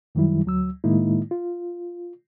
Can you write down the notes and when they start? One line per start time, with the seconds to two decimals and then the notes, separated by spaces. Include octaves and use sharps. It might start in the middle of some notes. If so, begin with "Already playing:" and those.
0.15 F#2 D#3 F#3 G3 E4
0.46 D2 F#3 E6
0.84 A2 D#3 G#3 A#3 D#4 E4
1.31 F4